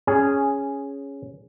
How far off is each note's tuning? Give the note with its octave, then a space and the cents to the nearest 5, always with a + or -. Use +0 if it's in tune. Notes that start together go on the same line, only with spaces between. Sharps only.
C#4 +0 G#4 +0